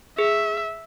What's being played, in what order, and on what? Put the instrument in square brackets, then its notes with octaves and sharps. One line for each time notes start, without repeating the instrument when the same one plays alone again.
[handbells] G#4 [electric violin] E5